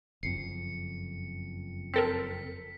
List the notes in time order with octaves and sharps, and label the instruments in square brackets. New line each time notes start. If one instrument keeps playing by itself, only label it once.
[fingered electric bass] F#1 F2 [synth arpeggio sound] C7 [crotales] C#7
[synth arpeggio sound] C4 A4 A#4 [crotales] B6